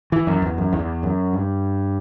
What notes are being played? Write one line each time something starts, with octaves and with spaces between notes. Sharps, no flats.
E3
F#2
E2
F#2
E2
F#2
G2